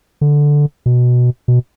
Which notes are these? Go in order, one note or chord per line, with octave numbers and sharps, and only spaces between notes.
D3
B2
B2